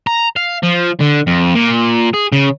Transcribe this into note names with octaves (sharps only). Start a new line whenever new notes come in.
A#5
F5
F3
D3
F2
A#2
G#4
C#3